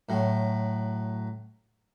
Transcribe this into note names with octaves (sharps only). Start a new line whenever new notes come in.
A2 F#3